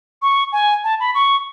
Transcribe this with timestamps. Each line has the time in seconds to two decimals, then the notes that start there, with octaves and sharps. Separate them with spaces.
0.22 C#6
0.53 G#5
0.84 A5
1.00 B5
1.15 C#6